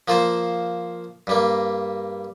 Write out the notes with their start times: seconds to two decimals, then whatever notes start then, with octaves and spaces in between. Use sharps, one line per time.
0.08 F3 A#3 F4 C5
1.27 G2 G3 A#3